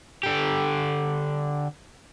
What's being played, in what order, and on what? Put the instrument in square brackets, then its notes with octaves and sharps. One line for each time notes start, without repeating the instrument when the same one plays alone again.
[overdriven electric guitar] D3 G4